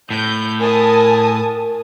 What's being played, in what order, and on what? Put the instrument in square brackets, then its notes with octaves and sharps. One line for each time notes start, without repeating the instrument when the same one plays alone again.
[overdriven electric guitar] A2 [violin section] G6
[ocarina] A#4 [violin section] G#5 A5 D#6